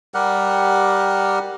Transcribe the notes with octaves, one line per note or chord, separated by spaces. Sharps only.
G3 G4 A#4 F#5